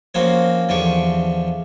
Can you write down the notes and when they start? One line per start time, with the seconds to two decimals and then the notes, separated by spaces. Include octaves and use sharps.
0.15 F3 A#3 C4 C#4 F#4
0.69 E2 D3 F3 G4 C#6